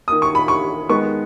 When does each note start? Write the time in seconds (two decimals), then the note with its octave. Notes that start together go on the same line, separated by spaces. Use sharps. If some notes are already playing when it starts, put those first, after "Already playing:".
0.08 D#3 A#3 D#6
0.22 C#6
0.35 B5
0.48 C#6
0.89 D#3 G#3 B3 C#6